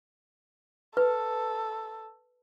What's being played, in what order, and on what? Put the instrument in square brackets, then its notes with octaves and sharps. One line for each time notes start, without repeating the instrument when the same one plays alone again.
[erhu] A4 [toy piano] B4